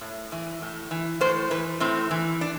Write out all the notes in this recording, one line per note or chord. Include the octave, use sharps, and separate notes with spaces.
A2
E3
A2
E3
A2 C5
E3 B4
A2 C4
E3
D4